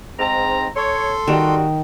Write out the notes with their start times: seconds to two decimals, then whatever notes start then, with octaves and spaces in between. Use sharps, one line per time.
0.19 G#2 C4 A#5
0.76 A4 C#5 C6
1.28 D#3 G3 F#4